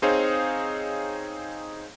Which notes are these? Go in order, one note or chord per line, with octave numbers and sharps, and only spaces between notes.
C4 D#4 G#4 C5 C#5 F5